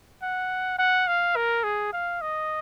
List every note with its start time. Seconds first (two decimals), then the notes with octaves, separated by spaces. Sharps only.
0.23 F#5
0.78 F#5
1.07 F5
1.36 A#4
1.63 G#4
1.93 F5
2.21 D#5